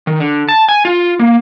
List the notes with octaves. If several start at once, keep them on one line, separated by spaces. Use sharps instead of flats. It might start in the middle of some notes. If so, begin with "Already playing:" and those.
D#3
D3
A5
G#5
F4
A#3